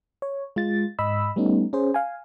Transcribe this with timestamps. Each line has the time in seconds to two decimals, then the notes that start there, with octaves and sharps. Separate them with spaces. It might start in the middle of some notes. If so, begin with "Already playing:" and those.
0.22 C#5
0.56 G#3 F4 A6
0.99 G#2 D#5 B5 E6
1.36 G3 A3 B3 C#4 D#4
1.73 C#4 G#4 C5
1.94 F5 G#5